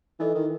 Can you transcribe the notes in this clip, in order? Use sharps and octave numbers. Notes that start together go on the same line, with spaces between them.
E3 D#4 A4 D#5
D#3